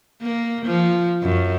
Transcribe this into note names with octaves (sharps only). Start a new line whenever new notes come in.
A#3
F3
F#2